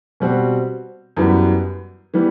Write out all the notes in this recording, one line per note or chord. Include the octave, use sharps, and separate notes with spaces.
B2 G3 C4 F#4
F#2 E3 G3 B3
E3 G3 B3